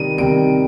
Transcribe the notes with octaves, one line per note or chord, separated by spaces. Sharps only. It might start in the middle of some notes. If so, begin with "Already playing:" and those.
Already playing: C3 D#3 G3 D#7
C3 D#3 G3 D7